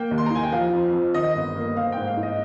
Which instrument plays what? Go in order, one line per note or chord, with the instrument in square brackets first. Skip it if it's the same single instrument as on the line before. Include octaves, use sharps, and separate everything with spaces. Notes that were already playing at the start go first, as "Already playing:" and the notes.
Already playing: [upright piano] A#3 G5
D#2
C6
A#5
D#4 G#5
G5
F3 F5
F2
F2
D#3 D#5
G1
A#3
C4 F5
G#2 G5
F5
D#4
D#5